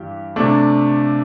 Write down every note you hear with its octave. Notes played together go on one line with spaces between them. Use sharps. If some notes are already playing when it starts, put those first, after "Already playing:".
Already playing: G2 E3 G3 G4
C3 A3 D4